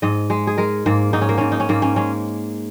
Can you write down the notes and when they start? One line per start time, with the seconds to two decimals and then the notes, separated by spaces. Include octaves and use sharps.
0.02 G#2 D#5
0.30 G#3
0.47 G#4
0.58 G#3 A#4
0.86 G#2 A#3
1.13 G#2 D#4
1.21 C#4
1.29 A#3
1.38 G#2 C#4
1.52 D#4
1.60 C#4
1.69 G#2 A#3
1.82 C#4
1.96 G#3 C#4